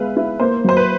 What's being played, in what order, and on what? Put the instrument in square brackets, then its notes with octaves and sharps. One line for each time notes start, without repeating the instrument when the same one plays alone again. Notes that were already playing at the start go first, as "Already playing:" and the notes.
Already playing: [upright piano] G#3 B3 [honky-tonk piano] B4 E5 F5
[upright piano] E4
[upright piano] A#3 [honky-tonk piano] C5
[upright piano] F#3 [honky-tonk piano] C5
[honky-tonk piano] B4